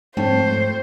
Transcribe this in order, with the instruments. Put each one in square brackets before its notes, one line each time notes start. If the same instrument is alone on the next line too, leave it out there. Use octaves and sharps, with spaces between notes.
[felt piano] F2 G5 A5 [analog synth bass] G#2 [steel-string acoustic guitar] A3 C#5 [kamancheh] C5